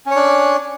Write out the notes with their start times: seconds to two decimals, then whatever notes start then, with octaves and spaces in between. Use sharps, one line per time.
0.06 C#4
0.11 C#5
0.16 D4